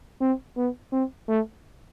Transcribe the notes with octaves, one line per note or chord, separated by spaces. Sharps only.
C4
B3
C4
A3